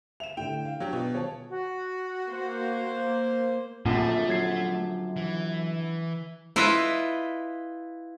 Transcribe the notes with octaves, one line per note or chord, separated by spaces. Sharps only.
E5 E7 F7
A2 D3 G5
F5
F#3 D4 G4
B2 F4
D#1 C#5 A5
F#4
A#3 C5
F#2 A#2 D3 F3 A3
F#3 G#6 C7
E3
E4 F4 B4 D#5 E5